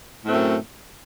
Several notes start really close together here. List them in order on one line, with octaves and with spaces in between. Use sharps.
A2 A3 C4 F#2